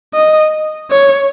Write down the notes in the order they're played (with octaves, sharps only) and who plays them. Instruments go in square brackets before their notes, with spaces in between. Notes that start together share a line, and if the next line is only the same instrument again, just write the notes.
[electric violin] D#5
C#5